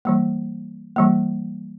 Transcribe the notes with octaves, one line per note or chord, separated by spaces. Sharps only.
E3 G3 A#3
E3 G3 A#3